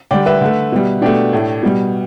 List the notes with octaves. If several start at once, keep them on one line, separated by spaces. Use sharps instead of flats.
D3 G3 D5 G5
B4 E5
D3 A3
B2 G3
B2 A3 D4 G4
A2 A3
B2 G3